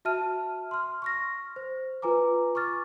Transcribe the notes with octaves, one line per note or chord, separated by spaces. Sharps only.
F#4 E5 A5 F6 D#7
C6 F6
C#6 F6 A#6
C5
F4 B4 G#5 A#5 D6
C#6 D6 F6 A6